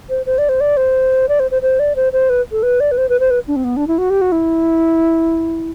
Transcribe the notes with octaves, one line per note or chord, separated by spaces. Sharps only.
C5
C5
D5
C5
D5
C5
D5
C5
C5
C5
D5
C5
C5
B4
A4
B4
D5
B4
C5
B4
C5
B4
D4
C4
B3
D4
E4
F#4
G4
F#4
E4